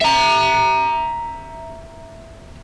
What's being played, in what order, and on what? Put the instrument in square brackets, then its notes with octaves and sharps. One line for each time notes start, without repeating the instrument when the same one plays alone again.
[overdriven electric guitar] E5 A#5